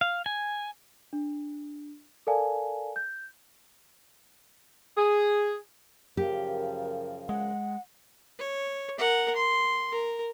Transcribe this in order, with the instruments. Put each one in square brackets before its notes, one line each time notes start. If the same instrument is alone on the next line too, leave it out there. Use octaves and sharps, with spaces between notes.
[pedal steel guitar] F5
G#5
[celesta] D4
A4 A#4 D5 F5 G#5 A5
G6
[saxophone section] G#4
[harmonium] F#2 C#3 F3 [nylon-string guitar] G4 [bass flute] A#4
[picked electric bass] G#3 [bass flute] F#5
[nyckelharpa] C#5
A#4 F#5
C6
A#4